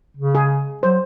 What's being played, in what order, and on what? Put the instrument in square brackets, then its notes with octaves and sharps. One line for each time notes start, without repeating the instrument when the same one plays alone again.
[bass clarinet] C#3
[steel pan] G#4
[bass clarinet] F#3 [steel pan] C5